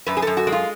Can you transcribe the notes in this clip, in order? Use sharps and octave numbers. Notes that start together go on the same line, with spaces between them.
F#2 B4
G#4
F#2 A4
F#4
G#3
F4